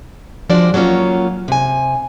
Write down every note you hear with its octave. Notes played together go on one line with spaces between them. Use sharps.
F3 G#3 D4 F#4 D5
F#3 G3 A#3 C#4 F4
C3 G#5